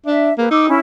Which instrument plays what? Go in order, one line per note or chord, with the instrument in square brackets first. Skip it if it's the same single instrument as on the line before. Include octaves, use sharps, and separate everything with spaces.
[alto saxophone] D4 [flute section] E5
[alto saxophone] A#3 [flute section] G#4 B4
[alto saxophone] D#4 [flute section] D6 E6
[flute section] C#4 E4